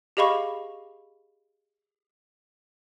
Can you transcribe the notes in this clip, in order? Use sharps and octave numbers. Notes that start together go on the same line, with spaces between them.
G4 G#4 D#5 F5 B5 C#6